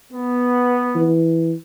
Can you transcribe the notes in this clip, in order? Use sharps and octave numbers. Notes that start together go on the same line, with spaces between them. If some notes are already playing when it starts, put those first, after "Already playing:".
B3
E3